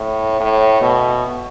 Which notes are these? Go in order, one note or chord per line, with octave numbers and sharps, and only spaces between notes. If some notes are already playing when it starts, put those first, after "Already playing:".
Already playing: A2
A2
B2